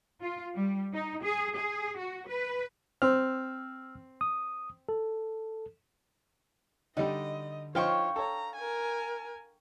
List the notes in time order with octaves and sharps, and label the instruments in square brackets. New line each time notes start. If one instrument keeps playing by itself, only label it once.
[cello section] F4
G3
D#4
G#4
G#4
F#4
B4
[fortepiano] C4 [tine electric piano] E6 F6
[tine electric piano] D#6
A4
[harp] D3 [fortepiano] G3 D#4 [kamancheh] D#5
[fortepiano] F3 D#4 C5 [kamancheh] C#5 [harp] F5 G5 C#6
[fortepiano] A4 C#5 [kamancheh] A#5
[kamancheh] A#4 G#5